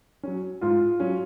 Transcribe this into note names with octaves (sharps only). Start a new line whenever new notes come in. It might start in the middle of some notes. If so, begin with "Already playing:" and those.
F#3 C#4
G#2 F4
F#3 C#4